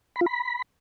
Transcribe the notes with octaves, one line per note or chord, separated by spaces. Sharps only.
B5
F4
B5